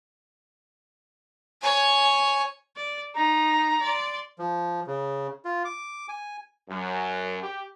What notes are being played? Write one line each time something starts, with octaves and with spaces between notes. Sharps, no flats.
C#5 G#5
D5
D#4 A#5
D5 C6
F3
C#3
F4
D6
G#5
F#2
G4